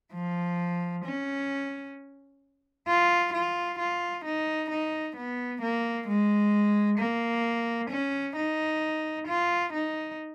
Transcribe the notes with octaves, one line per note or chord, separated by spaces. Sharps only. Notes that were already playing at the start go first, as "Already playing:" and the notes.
F3
C#4
F4
F4
F4
D#4
D#4
B3
A#3
G#3
A#3
C#4
D#4
F4
D#4